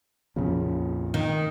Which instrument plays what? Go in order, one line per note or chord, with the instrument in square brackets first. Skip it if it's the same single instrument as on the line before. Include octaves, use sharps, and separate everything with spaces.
[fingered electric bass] A#1 F2 A#2 [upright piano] C#3
[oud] D#3